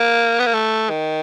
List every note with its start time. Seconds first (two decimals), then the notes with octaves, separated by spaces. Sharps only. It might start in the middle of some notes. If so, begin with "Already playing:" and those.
Already playing: A#3
0.39 B3
0.46 A#3
0.54 A3
0.90 D#3